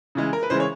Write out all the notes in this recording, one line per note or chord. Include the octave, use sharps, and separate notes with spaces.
C#3 E3 G#3
A#4
B4
C#3 E3 G#3 C5
C#5